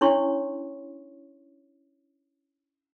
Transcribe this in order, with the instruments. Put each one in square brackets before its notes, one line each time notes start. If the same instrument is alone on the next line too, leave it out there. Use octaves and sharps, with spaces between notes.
[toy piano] C#4 D4 E4 C#5 C6 C#6